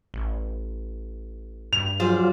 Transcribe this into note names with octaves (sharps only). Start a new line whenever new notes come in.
A1
G2 F7
F3 F#3 F4 G#4 C5 D5